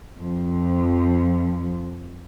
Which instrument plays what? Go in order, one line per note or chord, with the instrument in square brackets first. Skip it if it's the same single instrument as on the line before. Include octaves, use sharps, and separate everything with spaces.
[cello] F2 F3